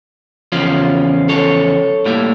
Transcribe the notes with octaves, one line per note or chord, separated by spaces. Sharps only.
E2 C#3 F3 C#4 F4
A4 C#5
A2 G3 A#3 E4